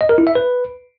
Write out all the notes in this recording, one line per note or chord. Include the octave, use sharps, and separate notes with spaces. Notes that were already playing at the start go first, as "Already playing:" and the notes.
D#5
A#4
E4
E5
B4